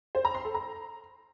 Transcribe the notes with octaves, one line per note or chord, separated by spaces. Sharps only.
C5
A#5
C6
A4
A#5